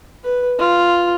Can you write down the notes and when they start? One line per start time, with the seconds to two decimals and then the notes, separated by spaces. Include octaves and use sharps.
0.24 B4
0.59 F4